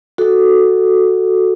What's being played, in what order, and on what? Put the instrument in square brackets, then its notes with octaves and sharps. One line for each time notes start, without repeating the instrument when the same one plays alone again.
[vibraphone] F#4 A4